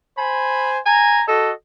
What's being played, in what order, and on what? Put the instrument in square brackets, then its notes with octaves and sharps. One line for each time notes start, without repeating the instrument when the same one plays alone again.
[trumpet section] C5 G#5 [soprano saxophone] B5
[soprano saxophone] G#5 [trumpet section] A#5
[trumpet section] F#4 D#5 [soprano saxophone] A4